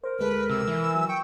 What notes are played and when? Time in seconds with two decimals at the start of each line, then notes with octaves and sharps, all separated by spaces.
0.04 A#4 C5
0.19 D2 G#3 A4 B4
0.49 C3 E6
0.68 E3
0.95 F#3
1.08 G5 C#6